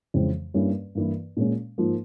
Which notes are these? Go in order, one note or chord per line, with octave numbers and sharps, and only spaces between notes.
F2 C#3 E3 G#3 C4
G2 G3 A#3 C#4 E4
G2 E3 A#3 E4
A#2 G#3 C#4
G#2 F3 A#3